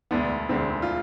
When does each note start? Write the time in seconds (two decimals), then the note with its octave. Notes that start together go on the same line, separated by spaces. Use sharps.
0.11 E1 D2 D3 B3 D4
0.49 E1 D2 D3 C4
0.82 F4